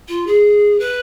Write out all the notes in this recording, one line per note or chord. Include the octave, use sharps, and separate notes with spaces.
F4
G#4
B4